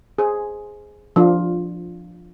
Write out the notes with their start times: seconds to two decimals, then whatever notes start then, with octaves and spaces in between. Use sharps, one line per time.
0.18 G#4 C5
1.16 F3 D4 F4